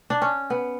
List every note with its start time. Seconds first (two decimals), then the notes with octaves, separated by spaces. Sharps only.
0.10 D4
0.22 C#4
0.50 B3